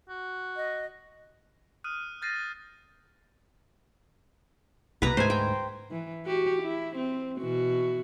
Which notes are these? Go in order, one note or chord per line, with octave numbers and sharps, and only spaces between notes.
F#4
D#5
D#6 F6 F#6 D#7
F6 G6 A6 A#6 C7 D#7
C2 B2 A#3 B4 A#5
D2 G#2 A3 C5 G#5
G5
E3
F#4 G4
E4
C4
B2 E3 F#4